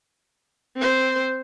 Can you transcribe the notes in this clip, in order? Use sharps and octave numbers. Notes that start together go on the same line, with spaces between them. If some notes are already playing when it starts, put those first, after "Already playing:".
C4 C5